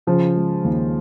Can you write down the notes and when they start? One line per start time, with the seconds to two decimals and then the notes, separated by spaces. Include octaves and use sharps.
0.07 C#3 F3
0.35 G#3
0.64 D#2